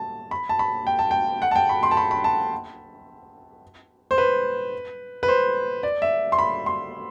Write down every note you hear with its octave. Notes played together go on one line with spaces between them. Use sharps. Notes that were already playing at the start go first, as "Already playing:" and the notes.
Already playing: A5
B5
A5
B5
G5
A5
G5
F#5
A5
G5
B5
C6
A5
B5
B5
A5
C5
B4
B4
C5
D5
E5
C6
B5
C6